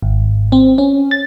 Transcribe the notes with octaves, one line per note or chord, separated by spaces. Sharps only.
G#1
C4
C#4
A6